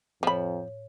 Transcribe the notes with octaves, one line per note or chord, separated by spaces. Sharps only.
F2 A2 F3 C#5 B5